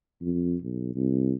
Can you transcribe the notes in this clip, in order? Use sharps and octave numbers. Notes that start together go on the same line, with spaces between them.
F2
B1
C2